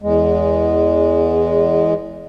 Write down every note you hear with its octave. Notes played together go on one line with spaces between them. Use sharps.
E2 G#3